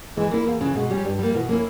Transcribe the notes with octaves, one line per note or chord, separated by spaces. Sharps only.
E3 G#3
A#3 E4
E2 A#3
C#3 E3
B2 G#3
G3 C#4 G4
G2 G3
G3 A#3
B2 E3
A#3 C#4 E4